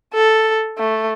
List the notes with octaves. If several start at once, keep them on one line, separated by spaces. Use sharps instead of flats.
A4
A3